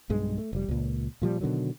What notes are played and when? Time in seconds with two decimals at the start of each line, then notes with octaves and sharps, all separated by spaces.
0.10 B1 G2 G#3
0.38 A3
0.53 F1 G3
0.68 C#2 A#2
1.22 A#2 F3 G3
1.41 B2 D3 D#3 F#3